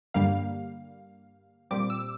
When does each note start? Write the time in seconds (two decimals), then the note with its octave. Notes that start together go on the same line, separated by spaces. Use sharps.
0.14 G2 D3 G3 A#3 F5
1.71 A#2 G3 C4 D6
1.90 E6